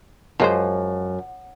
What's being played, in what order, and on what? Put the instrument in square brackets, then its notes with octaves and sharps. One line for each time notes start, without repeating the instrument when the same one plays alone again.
[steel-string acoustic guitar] F#2 [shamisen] F3 G#3 C5